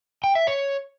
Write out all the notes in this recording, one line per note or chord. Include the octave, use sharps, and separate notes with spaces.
G5
E5
C#5